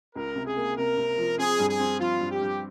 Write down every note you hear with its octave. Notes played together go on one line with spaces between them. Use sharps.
C#2 A#4
C3
G#4
A#3
C3 A#4
C3
F3
C4 G#4
G2
G#4
C4
F3 F4
G2
G4
G2